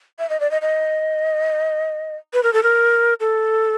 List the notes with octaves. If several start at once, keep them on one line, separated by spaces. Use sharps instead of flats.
E5
D#5
D5
D#5
D#5
B4
A#4
A4
A#4
A4